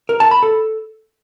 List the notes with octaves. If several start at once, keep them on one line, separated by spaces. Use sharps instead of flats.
A#4
A5
B5
A4